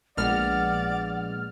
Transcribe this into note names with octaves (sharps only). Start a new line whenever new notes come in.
A#1 G#3 B3 C4 D5 F#5 F6